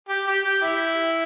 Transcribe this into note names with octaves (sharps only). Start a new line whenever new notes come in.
G4
G4
G4
E4